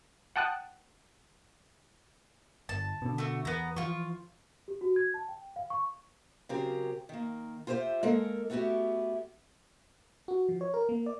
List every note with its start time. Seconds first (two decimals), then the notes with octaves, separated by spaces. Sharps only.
0.36 F#5 G5 A5 D#6 F#6
2.69 G1 A5
3.02 B2 D3
3.18 A3 F#4
3.45 E2 B3 A#5
3.76 E3 F3 F4 C#6
4.68 G4
4.81 F#4
4.96 G#6
5.14 A5
5.28 G5
5.56 F5
5.70 C#6
6.49 C#3 F#3 C4 G4 A#4
7.09 D#3 A#3
7.67 F4 G4 C5 D#5 E5
8.03 G#3 A#3 A4 A#4
8.50 A3 B3 E4 F#4 G4
10.28 F#4
10.49 F3
10.61 C#5
10.74 A#4
10.89 A#3
11.06 D5